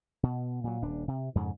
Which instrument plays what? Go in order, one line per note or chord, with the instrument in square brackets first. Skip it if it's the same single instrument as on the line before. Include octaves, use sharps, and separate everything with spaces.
[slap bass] B2
A#2 F#3
D#1 D4
C3
F2 G#2 C#3